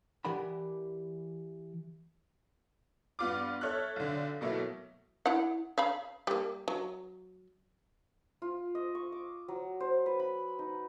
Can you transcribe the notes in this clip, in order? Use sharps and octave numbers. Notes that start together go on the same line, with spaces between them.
E3 G4 A#4 D5 F#5 B5
G2 B3 F4 D6
A4 C#5 E5 F6 F#6
B1 D3
B2 F#3 A3 A#3 E4
E4 F#5
E5 F5 B5
G3 A#3
F#3
F4
D#5
C#6
D6
F#3
C5
B4
B5
D#4